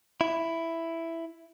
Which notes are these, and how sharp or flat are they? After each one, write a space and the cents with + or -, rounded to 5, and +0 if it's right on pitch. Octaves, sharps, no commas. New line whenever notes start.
E4 +5